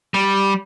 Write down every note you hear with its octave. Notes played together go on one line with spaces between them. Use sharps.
G3